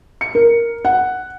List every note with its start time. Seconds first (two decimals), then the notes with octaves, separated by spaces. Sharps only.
0.21 C#7
0.35 A#4
0.85 F#5